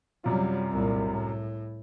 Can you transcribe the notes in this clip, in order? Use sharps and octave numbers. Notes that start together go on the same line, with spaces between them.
F#2 C3 F#3 G3 F4
C2 A#2
A2